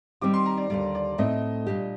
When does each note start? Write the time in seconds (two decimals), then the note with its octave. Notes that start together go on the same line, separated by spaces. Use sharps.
0.21 D#3 G3 C4 D#4 G4 D6
0.34 C6
0.46 A#5
0.57 D5
0.70 D#2 D3 G3 D5
0.95 D5
1.18 A2 A3 C4 D#4 D#5
1.67 A#2 G3 D4 G4